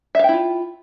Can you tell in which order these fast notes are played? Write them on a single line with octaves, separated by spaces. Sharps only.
E5 F5 G5 E4 F4